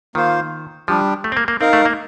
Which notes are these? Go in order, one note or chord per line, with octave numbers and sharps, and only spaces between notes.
D#3 A#3 F4 C5 F5
F3 G3 D4 G4
A3
C4
A#3
A#3
C4 D#4 A#4 F5
A3
A#3